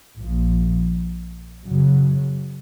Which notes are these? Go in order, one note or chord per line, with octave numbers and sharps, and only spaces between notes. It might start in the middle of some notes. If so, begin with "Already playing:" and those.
A#1 A#2 F3
F#2 C#3 F#3